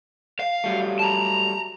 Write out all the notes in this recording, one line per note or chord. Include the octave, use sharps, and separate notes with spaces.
F5
F#3 G3 A3
A5 A#5